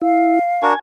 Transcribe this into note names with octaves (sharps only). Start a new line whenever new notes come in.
E4 F5
D4 F#4 A#4 G#5